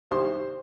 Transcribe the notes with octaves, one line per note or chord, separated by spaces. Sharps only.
C2 C3 D#3 G3 C5 C6